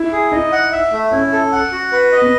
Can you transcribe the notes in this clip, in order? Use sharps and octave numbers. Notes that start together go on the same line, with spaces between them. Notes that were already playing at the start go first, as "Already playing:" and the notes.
Already playing: E4
G#4
D#4 D#5
F#5
E5
A3
C#4 E4
A4
F#5
F#4
B4
D#5
B3